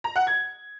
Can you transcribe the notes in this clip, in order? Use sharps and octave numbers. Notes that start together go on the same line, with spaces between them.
A#5
F#5
G#6